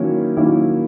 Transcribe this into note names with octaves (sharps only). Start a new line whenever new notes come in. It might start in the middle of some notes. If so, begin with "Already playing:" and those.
Already playing: D#3 F#3 A#3 C#4 E4
D#3 F#3 A#3 C#4 E4